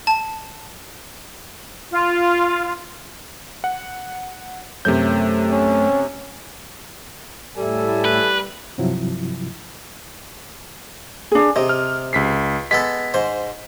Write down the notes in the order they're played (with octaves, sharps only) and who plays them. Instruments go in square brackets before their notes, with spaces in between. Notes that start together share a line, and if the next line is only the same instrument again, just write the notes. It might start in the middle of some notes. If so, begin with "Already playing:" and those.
[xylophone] A5
[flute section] F4
[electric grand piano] F#5
[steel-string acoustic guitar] F#2 A3 C#5 [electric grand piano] C3 G6
[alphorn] C#4
[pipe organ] A2 [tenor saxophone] G3 [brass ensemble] A4 E5 G#5
[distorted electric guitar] B4
[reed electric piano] G2 C3 F3 F#3 E4
[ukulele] D4 G#4
[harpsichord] C3 [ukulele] D#5
[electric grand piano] F6
C#2 B6 C7
[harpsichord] G#3 B3 A4 [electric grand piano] B6
[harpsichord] G#2 C5